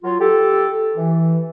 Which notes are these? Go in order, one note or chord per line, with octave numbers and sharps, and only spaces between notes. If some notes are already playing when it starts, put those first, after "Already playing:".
F#3 F4
G4 A4
E3